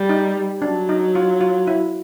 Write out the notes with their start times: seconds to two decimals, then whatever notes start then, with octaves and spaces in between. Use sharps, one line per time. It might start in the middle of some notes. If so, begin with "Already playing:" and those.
Already playing: G3
0.09 D#4
0.62 F#3 D4
0.89 D#4
1.15 F4
1.41 F4
1.67 E4